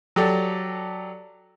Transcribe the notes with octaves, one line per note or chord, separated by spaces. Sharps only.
F#3 G4 A4 D5